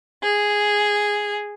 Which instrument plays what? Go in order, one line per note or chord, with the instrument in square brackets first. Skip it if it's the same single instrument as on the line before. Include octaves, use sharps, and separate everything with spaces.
[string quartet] G#4